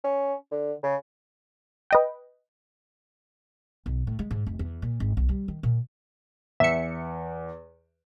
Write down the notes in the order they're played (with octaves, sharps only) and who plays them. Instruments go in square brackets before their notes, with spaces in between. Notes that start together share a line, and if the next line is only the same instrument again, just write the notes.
[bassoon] C#4
D3
C#3
[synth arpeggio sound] B4 D#5 G5
[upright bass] B1
A2
G#3
G#2
F1
E2
A#2
G#1
B1
G3
D#3
A#2
[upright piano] E2 [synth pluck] E5 C#7